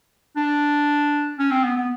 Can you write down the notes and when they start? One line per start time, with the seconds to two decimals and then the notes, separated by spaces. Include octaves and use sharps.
0.36 D4
1.39 C#4
1.51 C4
1.63 B3
1.76 B3